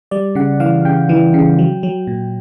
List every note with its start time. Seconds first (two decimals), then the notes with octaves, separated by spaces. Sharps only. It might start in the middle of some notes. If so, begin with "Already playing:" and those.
0.11 G3 D5
0.35 C#3 F#5
0.60 E3 F5
0.85 C#3 G5
1.09 E3
1.34 C#3
1.59 F#3
1.83 F#3
2.07 A#2